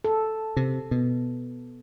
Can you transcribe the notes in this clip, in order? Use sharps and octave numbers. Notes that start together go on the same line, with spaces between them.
A4
C3
B2